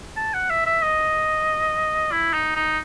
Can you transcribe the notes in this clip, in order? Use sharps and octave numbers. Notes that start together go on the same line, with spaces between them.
A5
F#5
E5
E5
D#5
E4
D#4
D#4